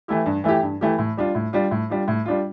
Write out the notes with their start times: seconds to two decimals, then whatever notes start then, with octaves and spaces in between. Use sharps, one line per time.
0.08 E3 A3 E4 G4
0.26 G2
0.44 E3 A3 E4 G4
0.63 G2
0.81 E3 A3 E4 G4
0.98 A2
1.17 G3 D4 F4
1.35 A2
1.53 G3 D4 F4
1.71 A2
1.90 G3 D4 F4
2.08 A2
2.26 G3 D4 F4